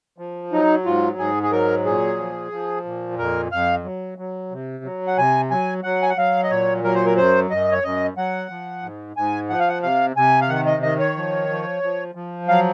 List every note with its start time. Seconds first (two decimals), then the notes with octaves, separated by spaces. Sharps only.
0.18 F3
0.52 F#3 D#4
0.85 G#2 F4
1.18 G#2 G#4
1.43 G#4
1.52 F#3 A#4
1.85 A#2 G#4
2.18 F3
2.52 F3
2.85 A#2
3.18 F2 A#4
3.52 F2 F5
3.84 F#3
4.18 F#3
4.51 C3
4.84 F#3
5.07 F#5
5.18 C3 G#5
5.51 F#3 G#5
5.83 F#3 F#5
6.02 G#5
6.10 F#5
6.17 F#3 F5
6.43 D#5
6.50 A#2 C#5
6.84 F#3 A#4
6.95 C5
7.06 A#4
7.17 F#2 C5
7.50 F#2 D#5
7.72 C#5
7.83 F#2 D#5
8.17 F#3 F#5
8.50 F3
8.83 G#2
9.16 G#2 G#5
9.50 F3 F#5
9.59 F5
9.69 F#5
9.82 C3 F5
10.16 C3 G#5
10.41 F5
10.49 D#3 F#5
10.66 D#5
10.82 D#3 D#5
10.99 C#5
11.16 F3
11.49 F3
11.83 F3
12.15 F3
12.48 F#3 F5